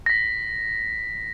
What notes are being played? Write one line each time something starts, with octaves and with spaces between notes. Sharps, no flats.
A#6 B6